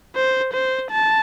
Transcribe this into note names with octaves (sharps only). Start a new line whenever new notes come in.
C5
C5
A5